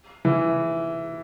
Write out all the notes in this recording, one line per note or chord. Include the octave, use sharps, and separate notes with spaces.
E3